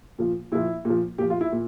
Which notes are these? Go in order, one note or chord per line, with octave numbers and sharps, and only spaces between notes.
A#2 F3
A#2 F3 E4
A#2
F3
A#2 F3 G4
F4
E4
A#2